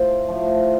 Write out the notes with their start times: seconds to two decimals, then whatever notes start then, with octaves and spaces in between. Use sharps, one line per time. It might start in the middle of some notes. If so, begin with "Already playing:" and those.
Already playing: A2 F3 C5 F5
0.29 A2 F3